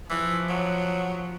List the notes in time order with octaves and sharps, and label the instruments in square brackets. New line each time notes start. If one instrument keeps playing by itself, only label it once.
[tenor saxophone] E3 [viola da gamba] F3
[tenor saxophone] F#3